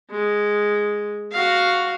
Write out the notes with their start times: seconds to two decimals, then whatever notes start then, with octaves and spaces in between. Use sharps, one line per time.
0.11 G#3
1.32 F#4 F5